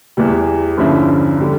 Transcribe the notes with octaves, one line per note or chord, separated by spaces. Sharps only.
E2 E3 G3
G1 G2 F3 C#4 E4
D3 G3